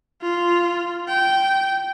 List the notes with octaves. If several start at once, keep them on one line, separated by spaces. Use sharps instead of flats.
F4
G5